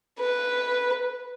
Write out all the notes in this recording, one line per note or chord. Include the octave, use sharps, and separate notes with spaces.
B4